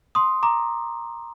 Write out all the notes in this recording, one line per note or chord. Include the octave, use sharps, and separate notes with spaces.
C6 D#6
A#5 D6